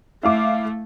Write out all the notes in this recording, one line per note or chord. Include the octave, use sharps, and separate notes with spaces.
A3 E4 F5 D6